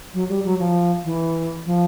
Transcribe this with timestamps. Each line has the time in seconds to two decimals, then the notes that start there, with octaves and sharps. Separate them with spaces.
0.14 F#3
0.29 G3
0.44 F#3
0.59 F3
1.04 E3
1.66 F3